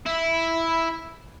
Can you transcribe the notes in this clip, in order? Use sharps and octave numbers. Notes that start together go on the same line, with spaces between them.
E4